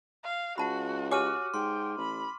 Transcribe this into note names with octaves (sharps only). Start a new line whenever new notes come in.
F5
C#2 F#4 F#5 A5 B5
F#4 G4 C#5 G#5 D6 F6 D#7
G#2 G5 C6
A1 B5